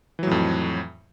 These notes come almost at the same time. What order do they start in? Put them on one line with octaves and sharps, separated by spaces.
E3 F#3 A2 F2